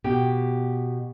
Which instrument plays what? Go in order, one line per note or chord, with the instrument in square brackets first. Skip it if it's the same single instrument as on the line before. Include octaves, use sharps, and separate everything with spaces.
[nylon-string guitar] B2 [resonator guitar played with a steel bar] G4